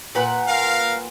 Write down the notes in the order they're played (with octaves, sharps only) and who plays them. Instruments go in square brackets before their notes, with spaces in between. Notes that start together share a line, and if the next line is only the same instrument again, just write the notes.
[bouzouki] A#2 B4 F#5
[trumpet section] A#4 F5